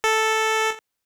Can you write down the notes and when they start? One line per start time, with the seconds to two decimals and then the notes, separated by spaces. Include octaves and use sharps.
0.04 A4